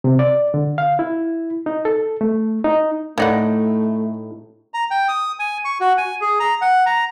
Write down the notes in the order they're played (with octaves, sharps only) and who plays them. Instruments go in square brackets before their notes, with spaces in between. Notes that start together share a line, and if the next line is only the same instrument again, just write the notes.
[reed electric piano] C3
D5
D3
F5
E4
D#4
A4
A3
D#4
[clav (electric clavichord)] A2 D#4 [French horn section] A3 [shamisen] E4 D5 F#5
[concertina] A#5
G5
D#6
G#5
C#6
F#4
G#5
G#4
A#5
F#5
A#5